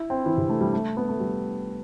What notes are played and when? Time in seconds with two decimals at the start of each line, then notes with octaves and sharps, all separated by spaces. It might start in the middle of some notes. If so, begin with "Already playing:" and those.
Already playing: E4
0.10 C4
0.26 E3
0.37 C3
0.49 A3
0.61 G3
0.73 A3
0.97 B3
1.09 A3
1.20 G3